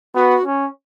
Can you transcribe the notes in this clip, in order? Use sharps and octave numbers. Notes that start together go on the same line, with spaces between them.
B3 F#4
C#4